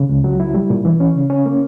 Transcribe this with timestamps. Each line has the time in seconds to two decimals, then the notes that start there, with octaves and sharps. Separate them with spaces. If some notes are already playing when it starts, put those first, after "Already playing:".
Already playing: C#3
0.09 C#2
0.24 F#3
0.40 E4
0.54 G3
0.70 A#2
0.85 E3
1.00 C#4
1.15 C#3
1.30 C#4
1.46 A#3